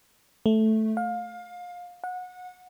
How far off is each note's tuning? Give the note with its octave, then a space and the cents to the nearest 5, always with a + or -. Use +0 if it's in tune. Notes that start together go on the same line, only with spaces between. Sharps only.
A3 -5
F5 +25
F#5 -25